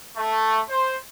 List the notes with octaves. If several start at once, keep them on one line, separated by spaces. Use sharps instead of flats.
A3
C5